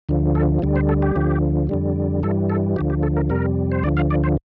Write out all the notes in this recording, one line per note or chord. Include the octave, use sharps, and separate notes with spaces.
D2 D3 F3
A4
D2 D3 G3
C5
A4
G4
D2 D3 F3
F2 D3 G3
G2 E3 G3 A4
A4
D2 D3 F3 G4
G4
A4
A#4
F2 C3 G3 A#4
C5
D2 D3 F3 D5
F5
D5
C5